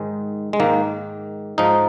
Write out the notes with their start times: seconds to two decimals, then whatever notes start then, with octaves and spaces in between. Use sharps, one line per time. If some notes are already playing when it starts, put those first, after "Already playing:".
Already playing: G#2 D#3 G#3
0.53 G#3
0.60 G#2 D#3 A#3
1.58 G#2 F3 D#4